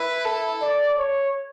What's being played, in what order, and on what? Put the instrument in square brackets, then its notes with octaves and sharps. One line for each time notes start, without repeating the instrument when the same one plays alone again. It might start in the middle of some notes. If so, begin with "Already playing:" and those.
Already playing: [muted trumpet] E4 [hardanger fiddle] B4
[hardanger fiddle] A4
[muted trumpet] D5
C#5